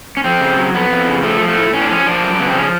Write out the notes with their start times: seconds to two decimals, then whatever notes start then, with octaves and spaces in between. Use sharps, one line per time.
0.17 C#4
0.24 F2 C4
0.40 C#3
0.57 F#3
0.74 F2 B3
0.90 F2
1.08 C#3
1.23 F3 A3
1.40 F3
1.48 A3
1.56 A2
1.73 A2 C#4
1.82 D4
1.90 F3 C#4
2.06 F3 D4
2.23 F#2
2.39 C#3 B3
2.49 C4
2.56 F3 C#4